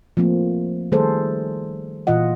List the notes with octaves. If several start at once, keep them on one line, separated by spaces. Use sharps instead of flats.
F3 A3 A#3 C4
D#3 G3 A3 G#4 A4 C5
A#2 E3 F4 D#5 F#5